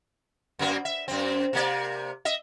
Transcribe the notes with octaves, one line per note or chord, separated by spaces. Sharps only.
F#2 A#3 B3
E5
F#2 C4
C3 A#3 D5
D#5 E5